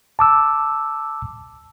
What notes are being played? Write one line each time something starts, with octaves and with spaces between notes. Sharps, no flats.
A5 D6 E6